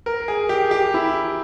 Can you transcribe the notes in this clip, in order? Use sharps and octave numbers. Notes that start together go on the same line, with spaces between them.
A#4
G#4
G4
G4
E4